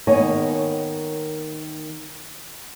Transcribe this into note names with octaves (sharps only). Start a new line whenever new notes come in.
D#3 A#3 B3 C#5 D#5 G#5